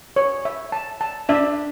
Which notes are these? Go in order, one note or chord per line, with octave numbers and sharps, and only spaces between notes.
C#5
E5
A5
A5
D4 E5